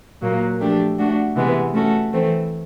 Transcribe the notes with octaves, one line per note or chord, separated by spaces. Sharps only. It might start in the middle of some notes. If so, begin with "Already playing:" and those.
A#2 F#3 A#3
F3 A3 D4 G4
A3 D4 F#4
C3 E3 G#3 B3
A3 C#4 F#4 A4
E3 A3 C4